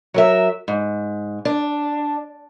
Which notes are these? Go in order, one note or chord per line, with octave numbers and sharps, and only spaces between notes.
F#3 A#4 E5
G#2
D4